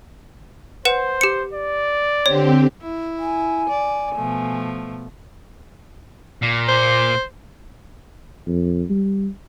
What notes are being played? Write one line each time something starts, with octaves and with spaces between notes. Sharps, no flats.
B4 C5 F#5 E7
G4 C#7
D5
D3 C4 G4 C#5
E4
G#5
D5
B2 F3 A3
A#2
C5
F2
G3